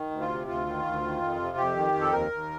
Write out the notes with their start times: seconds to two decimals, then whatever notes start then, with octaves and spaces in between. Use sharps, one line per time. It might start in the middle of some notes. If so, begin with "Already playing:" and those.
Already playing: D#3
0.11 D2
0.21 F4
0.29 C3
0.47 D2 F4
0.66 D#3
0.85 D2
1.02 D#3
1.21 F2
1.39 C3
1.57 F2 G4
1.76 D#3
1.93 F2
2.01 A4
2.12 D#2 A#4
2.31 D#2